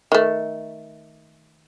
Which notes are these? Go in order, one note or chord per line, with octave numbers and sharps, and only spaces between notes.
D#3 A3